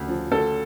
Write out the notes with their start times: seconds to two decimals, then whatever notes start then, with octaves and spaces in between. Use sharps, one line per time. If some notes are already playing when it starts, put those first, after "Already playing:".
Already playing: D2 C#3
0.09 F3
0.31 D2 A4